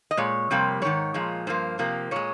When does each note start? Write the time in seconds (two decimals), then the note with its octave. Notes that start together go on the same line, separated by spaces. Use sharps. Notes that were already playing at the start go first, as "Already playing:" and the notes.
0.11 D#5
0.17 A#2 G#3 C#5
0.50 F2 C3 G3 A#3
0.82 G#2 D#3 G#3 C#5
1.14 A#2 F3 G#3
1.47 G2 F3 A#3 C5
1.79 C3 F3 A#3
2.11 A#2 G#3 C#5